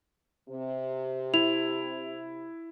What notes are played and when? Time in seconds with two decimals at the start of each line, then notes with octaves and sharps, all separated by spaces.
0.49 C3
1.34 E4 F7